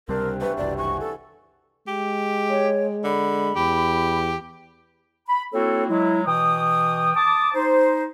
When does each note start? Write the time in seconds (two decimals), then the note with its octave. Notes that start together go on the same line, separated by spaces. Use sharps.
0.09 C#2 C3 G3 C4 D4 G4 A#4
0.41 B2 E3 A3 B4
0.58 F#1 C2 C3 D5
0.78 C#5 F#5 G#5 C#6
1.00 A4
1.88 G#3 G4
2.50 C#5
3.04 D3 B5
3.56 E2 G4
5.28 B5
5.53 A#3 C4 E4 F#4 A4 C#5
5.89 F#3 G#3 E4
6.26 B2 E3 G5 D#6
7.15 A5 D6 D#6
7.54 D#4 C5